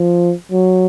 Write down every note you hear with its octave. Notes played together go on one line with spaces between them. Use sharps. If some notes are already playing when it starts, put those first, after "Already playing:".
Already playing: F3
F#3